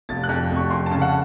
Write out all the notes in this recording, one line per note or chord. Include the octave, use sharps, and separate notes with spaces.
F1 A6
F#6
F2
F1
C#6
F2 C6
C#3 A5
F#5